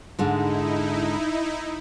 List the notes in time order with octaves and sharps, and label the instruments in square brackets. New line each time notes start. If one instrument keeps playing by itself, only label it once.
[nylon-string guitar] G#2 D3 G#3 [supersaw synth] D#4 E4